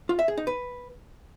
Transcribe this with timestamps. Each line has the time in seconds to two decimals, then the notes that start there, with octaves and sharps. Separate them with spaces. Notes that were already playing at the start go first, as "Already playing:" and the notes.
0.09 F4
0.19 E5
0.28 G#4
0.37 D#4
0.47 B4